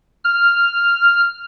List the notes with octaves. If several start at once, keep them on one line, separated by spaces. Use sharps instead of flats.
F6